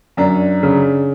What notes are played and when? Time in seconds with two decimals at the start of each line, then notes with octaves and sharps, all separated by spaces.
0.17 F#2 D4
0.63 C#3